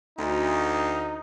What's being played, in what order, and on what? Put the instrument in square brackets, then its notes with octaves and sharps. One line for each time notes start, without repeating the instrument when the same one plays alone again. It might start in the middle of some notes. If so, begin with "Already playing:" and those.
[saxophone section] D2 [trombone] D#4